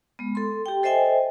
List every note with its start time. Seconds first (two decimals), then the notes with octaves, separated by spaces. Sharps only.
0.19 G#3 B3
0.35 A4 C6
0.66 G4 G5
0.83 A4 C5 D#5 E5 G5 G#5